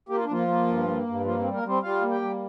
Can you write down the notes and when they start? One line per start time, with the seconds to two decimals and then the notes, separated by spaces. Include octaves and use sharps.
0.09 A#3 G4
0.17 F4
0.25 D4
0.29 F3 A#3 F4
0.48 A#3
0.67 G2
0.87 A#3
1.06 G2
1.25 F3 A#3 F4
1.39 G3 C4
1.53 A#3 A#4
1.63 G3
1.68 C4 C5
1.83 G3 F4 F5
2.02 A#3
2.11 G4 G5
2.21 G3